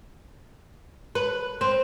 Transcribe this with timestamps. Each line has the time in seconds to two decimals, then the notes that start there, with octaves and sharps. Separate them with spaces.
1.15 B4
1.61 C4